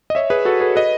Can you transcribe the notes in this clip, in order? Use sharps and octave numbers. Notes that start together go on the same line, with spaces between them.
D#5
C#5 E5
G#4 B4
F#4 A4
G#4 B4
B4 D#5